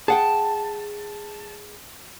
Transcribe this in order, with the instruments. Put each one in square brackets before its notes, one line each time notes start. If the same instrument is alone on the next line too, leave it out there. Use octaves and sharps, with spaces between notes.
[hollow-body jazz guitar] G#4 F#5 G5 [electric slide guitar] A5